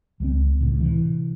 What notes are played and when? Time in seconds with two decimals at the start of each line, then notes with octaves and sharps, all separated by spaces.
0.20 C#2 F#3 C4
0.59 D#1 C#2 A2
0.80 C3 E3